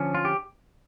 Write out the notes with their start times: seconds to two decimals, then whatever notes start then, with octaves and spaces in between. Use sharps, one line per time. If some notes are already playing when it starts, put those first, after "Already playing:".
Already playing: D3 F3 C#4
0.15 F4
0.25 G4